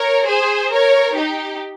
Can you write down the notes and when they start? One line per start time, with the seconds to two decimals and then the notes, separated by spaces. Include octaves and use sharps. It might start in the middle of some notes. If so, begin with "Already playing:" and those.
Already playing: A#4 C#5
0.29 G#4 C5
0.73 A#4 C#5
1.16 D#4 G4